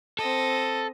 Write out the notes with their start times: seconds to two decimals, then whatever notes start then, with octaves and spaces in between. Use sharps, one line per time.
0.19 C4 A4 D#5